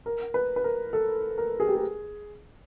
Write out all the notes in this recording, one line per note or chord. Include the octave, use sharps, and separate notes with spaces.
A#4
B4
B4
A#4
A4
A#4
G#4
G4
G#4